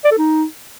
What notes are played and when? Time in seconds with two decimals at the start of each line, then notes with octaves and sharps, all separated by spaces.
0.05 D5
0.11 A4
0.18 D#4